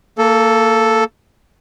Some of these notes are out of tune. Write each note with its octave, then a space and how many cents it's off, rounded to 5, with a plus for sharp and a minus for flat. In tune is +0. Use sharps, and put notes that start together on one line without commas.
A#3 -25 A4 +0